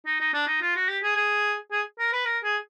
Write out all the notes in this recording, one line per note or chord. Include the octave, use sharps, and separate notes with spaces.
D#4
D#4
D4
D#4
F4
F#4
G4
G#4
G#4
G#4
A#4
B4
A#4
G#4